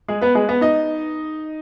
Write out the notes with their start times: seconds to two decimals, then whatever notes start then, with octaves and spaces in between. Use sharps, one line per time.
0.08 G#3 G#4
0.21 B3 B4
0.35 G#3 G#4
0.48 B3 B4
0.61 D#4 D#5